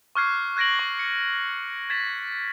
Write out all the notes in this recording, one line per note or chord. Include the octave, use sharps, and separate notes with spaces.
C#6 D6 F6 F#6 G#6 C7
F#6 G#6 A#6 D7 F#7
C#6
C#7
G#6 A6 B6 E7